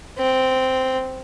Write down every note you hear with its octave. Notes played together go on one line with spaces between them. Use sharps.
C4